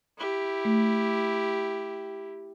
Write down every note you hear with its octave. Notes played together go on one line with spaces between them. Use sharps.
E4 G4
A3